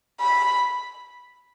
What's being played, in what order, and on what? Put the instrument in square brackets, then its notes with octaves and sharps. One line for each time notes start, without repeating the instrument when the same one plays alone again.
[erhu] B5